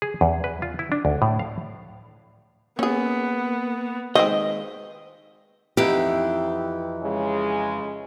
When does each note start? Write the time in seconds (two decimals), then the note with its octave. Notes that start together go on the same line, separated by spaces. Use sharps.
0.02 G#4
0.21 E2
0.44 B4
0.62 F4
0.79 E4
0.92 D4
1.05 D2
1.22 A2
1.39 F5
2.79 A#3 B3 C#4 G#4
4.15 D#3 G#3 C4 B4 C5 D#5
5.77 F2 E3 D#4 E4 G4 F#5
7.02 C#3 G#3